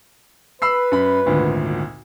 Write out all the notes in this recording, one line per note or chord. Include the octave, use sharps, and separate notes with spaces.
B4 B5 E6 C7
F#2 B5
G#1 D2 A#2